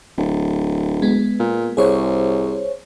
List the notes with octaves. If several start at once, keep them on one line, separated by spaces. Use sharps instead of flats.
D1
G#3 B3
A#2
C2 G#4 C5 C#5